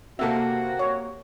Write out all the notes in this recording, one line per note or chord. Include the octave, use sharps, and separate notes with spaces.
C3 A#3 C4 F#4 A4 E5
C#5